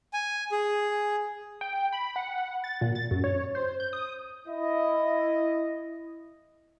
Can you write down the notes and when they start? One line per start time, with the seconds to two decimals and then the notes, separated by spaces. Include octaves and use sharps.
0.13 G#5
0.52 G#4
1.61 G5
1.93 B5
2.16 F#5
2.64 A6
2.81 A#2
2.95 A6
3.11 F#2
3.24 C#5
3.55 C5
3.80 G6
3.93 D#6
4.48 E4 D#5